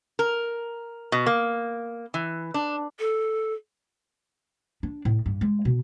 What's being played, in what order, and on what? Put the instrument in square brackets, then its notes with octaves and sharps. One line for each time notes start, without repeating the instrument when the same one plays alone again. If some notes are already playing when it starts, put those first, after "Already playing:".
[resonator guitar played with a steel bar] A#4
B2
A#3
E3
D4
[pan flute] A4
[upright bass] D4
A2
G2
G#3
B2